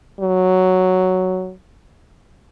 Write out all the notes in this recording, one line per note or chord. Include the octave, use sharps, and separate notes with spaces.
F#3